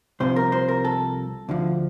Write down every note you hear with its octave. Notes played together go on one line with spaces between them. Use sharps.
C2 C3 F3 C5
A#4
C5
A#4
A4
D2 D3 F3